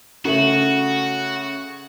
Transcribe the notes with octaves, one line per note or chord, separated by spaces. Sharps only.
C#3 A3 F#4